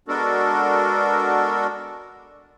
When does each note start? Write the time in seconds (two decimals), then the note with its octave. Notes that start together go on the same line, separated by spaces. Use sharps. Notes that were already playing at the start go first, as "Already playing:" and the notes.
0.08 G#3 B3 D4 F#4 A4 A#4